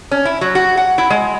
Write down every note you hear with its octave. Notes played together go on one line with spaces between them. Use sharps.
C#4
E4
F#3
F#4
F#5
E4
G#3